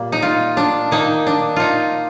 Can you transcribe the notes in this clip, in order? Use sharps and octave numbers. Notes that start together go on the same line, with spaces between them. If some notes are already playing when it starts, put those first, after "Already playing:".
Already playing: A#2 G3 A#3
D#4
F4
D4
D#3 A#3 D#4
D4
D#4 F4